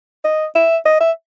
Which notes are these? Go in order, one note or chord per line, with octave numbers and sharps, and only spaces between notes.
D#5
E5
D#5
E5